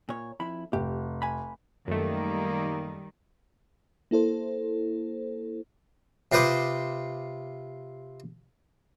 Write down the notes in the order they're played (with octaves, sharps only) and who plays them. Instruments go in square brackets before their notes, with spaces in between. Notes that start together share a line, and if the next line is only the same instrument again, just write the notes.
[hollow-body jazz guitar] A#2 C#5
F2 E4 B5
[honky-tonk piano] F1 [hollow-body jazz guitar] G4
[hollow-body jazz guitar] G#5 B5
[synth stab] F#2 A3 [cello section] D#3 G3 [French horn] A#3
[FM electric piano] A#3 E4 A4 C5
[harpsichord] C3 F4 B4 C5 D6 D#6